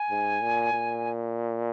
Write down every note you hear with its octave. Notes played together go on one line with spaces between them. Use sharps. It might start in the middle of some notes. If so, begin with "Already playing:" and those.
Already playing: G#5
G#2
A#2
A#2